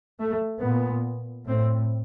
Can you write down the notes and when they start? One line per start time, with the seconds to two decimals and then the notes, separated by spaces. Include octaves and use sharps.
0.20 A3
0.62 A#2 B3
1.47 A2 C4